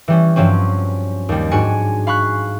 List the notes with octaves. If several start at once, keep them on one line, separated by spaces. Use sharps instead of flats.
E3 G3 C#4
G2 F3 F#3 C4 C#4
D#2 G3
G#2 D4 F#4 G#5 C#7
F5 B5 C#6 F#6